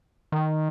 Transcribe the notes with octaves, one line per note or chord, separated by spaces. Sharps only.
D#3